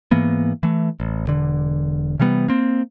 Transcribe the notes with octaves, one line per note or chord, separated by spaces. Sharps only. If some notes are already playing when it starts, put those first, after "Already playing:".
G#2 E3 A#3 B3
E3 A3
A1
E1 D3
C3 E3 G3 B3
A#3 C4